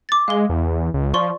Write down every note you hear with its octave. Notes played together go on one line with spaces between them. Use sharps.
D6 A6
G#3 F5 G7
E2
C#2
F3 D5 C6 C#6